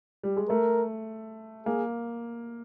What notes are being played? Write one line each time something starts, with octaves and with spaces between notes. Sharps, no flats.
G3
G#3
A3 A#4
A#3 G#4